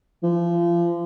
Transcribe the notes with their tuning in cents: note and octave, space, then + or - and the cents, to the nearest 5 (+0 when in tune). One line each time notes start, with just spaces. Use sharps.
F3 -30